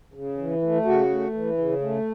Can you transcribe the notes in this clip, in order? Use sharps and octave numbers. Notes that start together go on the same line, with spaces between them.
C#3
E3
A3
C#3 F#4
A3
E3
C#3
A3